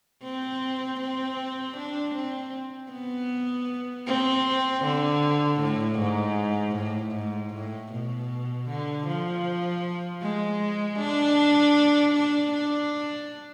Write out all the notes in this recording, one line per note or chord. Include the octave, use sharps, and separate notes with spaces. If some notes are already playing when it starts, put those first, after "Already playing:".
C4
C4
D4
C4
B3
C4
D3
A2
G#2
A2
G#2
A2
B2
D3
F3
G#3
D4
D4
D4